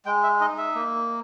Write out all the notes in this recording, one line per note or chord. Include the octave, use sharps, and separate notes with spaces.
G#3 G5
E5
D#4 D#5
E5
A#3